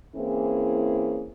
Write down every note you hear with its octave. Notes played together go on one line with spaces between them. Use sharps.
E3 A#3 C4 C#4 E4 G#4